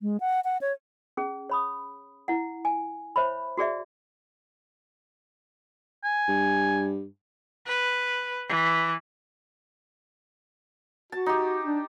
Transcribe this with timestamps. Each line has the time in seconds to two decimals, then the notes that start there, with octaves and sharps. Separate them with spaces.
0.01 G#3
0.20 F#5
0.44 F#5
0.61 C#5
1.17 C#4 G#4
1.50 C#5 B5 D#6
2.28 E4 F#5
2.65 G#5
3.16 C5 C#5 E5 B5
3.57 F#4 G#4 D5 E5
6.04 G#5
6.28 G2
7.67 B4
8.49 E3
11.12 F#4 A5
11.26 D#4 G4
11.65 D4